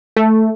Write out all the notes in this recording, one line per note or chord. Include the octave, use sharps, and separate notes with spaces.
A3